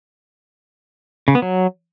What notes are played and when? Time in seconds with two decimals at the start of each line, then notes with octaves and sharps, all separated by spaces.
1.28 C#3
1.35 B3
1.42 F#3